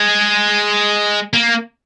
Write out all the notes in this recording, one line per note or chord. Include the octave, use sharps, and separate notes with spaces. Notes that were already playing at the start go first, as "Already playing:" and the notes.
Already playing: G#3
A#3